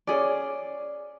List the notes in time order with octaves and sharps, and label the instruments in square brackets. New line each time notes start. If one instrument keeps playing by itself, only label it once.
[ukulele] C#4 G#4 D5